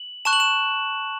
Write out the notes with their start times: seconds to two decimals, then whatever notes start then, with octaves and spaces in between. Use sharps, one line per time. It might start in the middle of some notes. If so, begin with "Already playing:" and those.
Already playing: F#7
0.25 A5 C#6 F#6 E7
0.33 F#7
0.40 E7